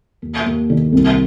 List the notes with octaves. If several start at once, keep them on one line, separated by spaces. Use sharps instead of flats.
D#2
D#2
D#3
C2